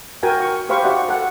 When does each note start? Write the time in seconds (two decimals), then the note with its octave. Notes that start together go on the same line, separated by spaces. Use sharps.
0.23 F#4 A#4 G5 G#5
0.41 C#6
0.69 G4 C5 F5 B5 C#6
0.83 F#4 G4 D5 E5 F#5
1.09 A4 F#5